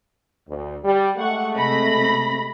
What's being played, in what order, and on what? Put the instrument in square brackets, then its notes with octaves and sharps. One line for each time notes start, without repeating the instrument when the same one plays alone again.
[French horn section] D2
G3
[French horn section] G#3 A3 [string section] F#5 C#6
[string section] C3 B5 A#6